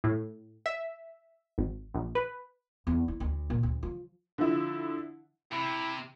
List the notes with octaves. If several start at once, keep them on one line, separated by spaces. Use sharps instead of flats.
A2
E5
G#1
A#1
B4
E2
E4
D2
A#2
D2
F3
D3 F3 E4
C3 E4